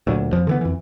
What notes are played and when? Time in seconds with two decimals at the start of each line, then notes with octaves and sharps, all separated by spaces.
0.07 D2 A#2 F#3
0.32 F2 F3
0.47 D3 E3 B3
0.61 F2 E3